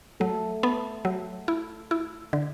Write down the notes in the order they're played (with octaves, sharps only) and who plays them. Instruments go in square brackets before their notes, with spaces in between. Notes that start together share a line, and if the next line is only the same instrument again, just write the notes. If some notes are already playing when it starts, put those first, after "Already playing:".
[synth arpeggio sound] F#3 [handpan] A3 A4
[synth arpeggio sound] B3
F#3
E4
E4
D3